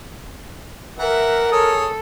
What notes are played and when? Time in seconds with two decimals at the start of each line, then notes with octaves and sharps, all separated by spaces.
0.99 E3 A#4 E5 F#5
1.52 G#4 A4 C#5 D#6